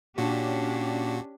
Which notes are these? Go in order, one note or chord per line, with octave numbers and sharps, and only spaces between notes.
A#2 C#4 D4 F#4 G4